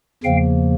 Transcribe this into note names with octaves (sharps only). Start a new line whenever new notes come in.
E2 C#3 F3 A#3 F5 G5